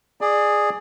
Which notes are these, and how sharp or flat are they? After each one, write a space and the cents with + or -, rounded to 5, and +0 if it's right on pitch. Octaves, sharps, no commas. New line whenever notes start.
G#4 +0 D5 +25